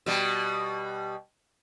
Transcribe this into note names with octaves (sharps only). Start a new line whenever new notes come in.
B2 G3